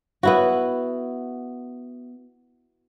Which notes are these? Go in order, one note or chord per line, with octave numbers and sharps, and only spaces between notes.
B3 E4 F#4